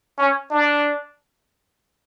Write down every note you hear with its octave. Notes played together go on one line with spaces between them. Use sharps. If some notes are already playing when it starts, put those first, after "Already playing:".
C#4
D4